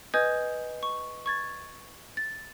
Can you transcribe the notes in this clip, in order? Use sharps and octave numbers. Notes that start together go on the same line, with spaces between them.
B4 D#5 G#5 D#6 G6 G#6
C#6
C#6 G#6 A6
A6